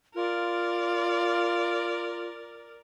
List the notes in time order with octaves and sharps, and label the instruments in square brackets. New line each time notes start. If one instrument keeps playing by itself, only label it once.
[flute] F4 [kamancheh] A#4 D5